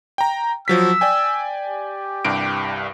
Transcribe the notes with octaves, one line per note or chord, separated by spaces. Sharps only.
G5 A#5
F3 F#3 E6 B6
D5 G5 G#5
G4
C2 G2 D7